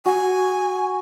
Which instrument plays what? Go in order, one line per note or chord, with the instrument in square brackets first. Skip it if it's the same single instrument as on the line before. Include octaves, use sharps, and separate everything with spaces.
[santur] F#4 [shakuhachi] G#5